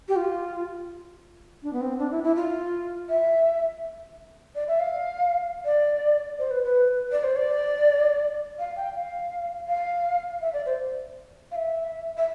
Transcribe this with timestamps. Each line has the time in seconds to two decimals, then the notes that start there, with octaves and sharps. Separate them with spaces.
0.08 G4
0.16 F4
1.63 D4
1.73 B3
1.81 C4
1.99 D4
2.11 E4
2.23 E4
2.36 F4
3.09 E5
4.55 D5
4.68 E5
4.80 F5
5.65 D5
6.39 C5
6.51 B4
6.63 B4
7.12 D5
7.24 C5
7.36 D5
8.59 F5
8.76 G5
8.95 F5
9.68 F5
10.41 E5
10.53 D5
10.66 C5
11.51 F5
11.56 E5
12.17 E5